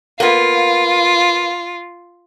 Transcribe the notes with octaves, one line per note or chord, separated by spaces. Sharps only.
A#3 B3 F4